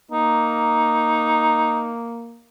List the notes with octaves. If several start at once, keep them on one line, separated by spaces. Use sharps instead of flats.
A#3 D#4